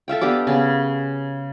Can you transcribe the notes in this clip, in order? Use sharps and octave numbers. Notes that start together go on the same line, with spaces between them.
A4 E5 F5 G5
B3 D4 G4 D6
C#3 B3